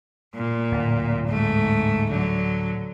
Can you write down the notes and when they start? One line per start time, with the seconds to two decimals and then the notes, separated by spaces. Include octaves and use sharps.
0.35 A#2
0.72 D1
1.28 G#2 A3
2.11 D3 F#3